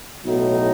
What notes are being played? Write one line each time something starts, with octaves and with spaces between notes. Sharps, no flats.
B1 A2 F#3 A3 D#4